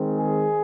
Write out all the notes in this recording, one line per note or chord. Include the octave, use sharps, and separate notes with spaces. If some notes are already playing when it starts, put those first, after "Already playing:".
Already playing: D#3 G#3 C4
G#4